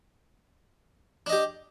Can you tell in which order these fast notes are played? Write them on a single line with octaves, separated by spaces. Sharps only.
D4 D#5 G4